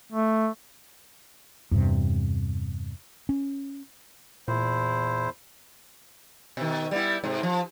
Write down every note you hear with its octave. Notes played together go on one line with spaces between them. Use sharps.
A3
E2 G2 C3
C#4
E2 A#2 E4 C5
B2 D#3
G3 B3 E4
G#2 C3
F3